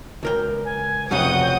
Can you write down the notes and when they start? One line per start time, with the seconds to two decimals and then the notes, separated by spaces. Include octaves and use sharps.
0.23 C#2 A#4 G5
0.65 G#5
1.11 F1 C2 C#3 F#3 F#5 G5 D#6 G6